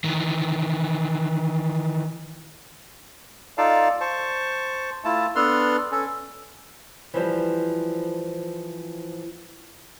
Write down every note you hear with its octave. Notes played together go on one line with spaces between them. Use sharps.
D#3 E3
D#4 F4 A4 D5 F5 A5
C5 A5 C#6
A3 E4 F4 A5
B3 D4 A4 B4 C6 F6
C#4 A4
E3 F3 G3